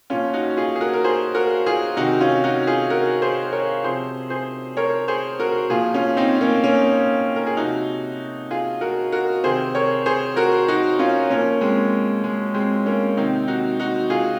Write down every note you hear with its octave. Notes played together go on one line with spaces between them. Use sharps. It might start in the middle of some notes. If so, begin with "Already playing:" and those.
A#2 F3 C#4 F4
D#4 F#4
F4 G#4
G#4
F#4 A#4
A#4
G#4 C5
F#4 A#4
F4 G#4
C3 D#3 D#4 F#4
C#4 F4
D#4 F#4
F4 G#4
F#4 A#4
G#4 C5
A#4 C#5
C3 F3 G#4 C5
G#4 C5
A#4 C#5
G#4 C5
F#4 A#4
A#2 F3 F4 G#4
C#4 F4
C4 D#4
A#3 C#4
A#3 C#4
A#4
G#4
C3 F3 D#4 F#4
F4 G#4
F#4 A#4
F#4 A#4
C3 D#3 G#4 C5
A#4 C#5
G#4 C5
F#4 A#4
D#4 F#4
C#4 F4
A#2 F3 A#3 C#4
G#3 C4
G#3
G#3 C4
A#3 C#4
C3 D#3 C4 D#4
D#4 F#4
D#4 F#4
F4 G#4